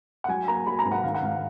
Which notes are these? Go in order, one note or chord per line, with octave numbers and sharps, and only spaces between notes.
F#5
F#3 G#5
A#3 A#5
F#3 B5
A#5
G#2
F#5
D#3 F5
F#5
G#2 F5